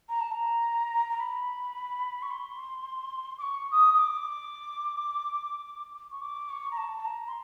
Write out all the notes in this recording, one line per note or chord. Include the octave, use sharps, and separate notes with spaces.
A#5
A5
A#5
A#5
B5
C#6
C6
D6
C#6
D#6
D#6
D6
C#6
D6
C#6
A#5
A5
A5
A#5
C6